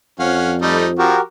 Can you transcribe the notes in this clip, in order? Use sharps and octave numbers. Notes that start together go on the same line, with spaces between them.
F2 C#4 F5 F#5
G3 A3 D#4
F3 F#4 G4 A#4